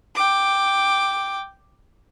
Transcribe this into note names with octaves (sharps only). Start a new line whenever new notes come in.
G5 D6